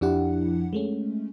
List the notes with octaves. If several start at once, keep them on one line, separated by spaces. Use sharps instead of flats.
F2 F3 D4 E4 G4 F#5
G#3 A3 C#4